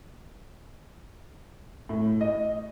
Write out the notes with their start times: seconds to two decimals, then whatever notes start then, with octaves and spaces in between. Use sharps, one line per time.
1.89 A2
2.21 D#5